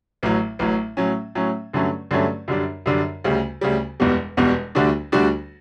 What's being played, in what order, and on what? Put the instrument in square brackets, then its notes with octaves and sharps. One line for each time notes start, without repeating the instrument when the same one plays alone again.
[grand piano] A1 A2 F#3
A1 A2 F#3
A2 F#3 C#4
A2 F#3 C#4
G2 D3 F#3 A3 C#4
G2 D3 F#3 A3 C#4
F#2 D3 G3 D4
F#2 D3 G3 D4
D2 C#3 G3
D2 C#3 G3
E1 E2 B2 G3
E1 E2 B2 G3
D2 D3 G3 D4 F#4
D2 D3 G3 D4 F#4